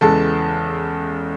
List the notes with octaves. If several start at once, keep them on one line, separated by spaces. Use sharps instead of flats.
E2 C#3 E3 G#3 A4 A5